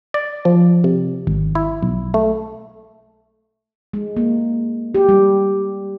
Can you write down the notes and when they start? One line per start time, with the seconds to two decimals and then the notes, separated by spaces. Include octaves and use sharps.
0.14 D5
0.45 F3
0.84 C3
1.27 G#1
1.55 E4
1.82 B1
2.14 A3
3.93 G#3
4.17 A#3
4.95 G4
5.09 G3